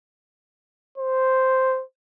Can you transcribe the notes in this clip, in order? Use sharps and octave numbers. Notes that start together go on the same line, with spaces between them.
C5